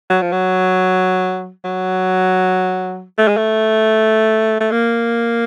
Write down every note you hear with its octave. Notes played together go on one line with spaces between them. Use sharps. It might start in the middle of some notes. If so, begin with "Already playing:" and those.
F#3
F3
F#3
F#3
A3
G#3
A3
A3
A#3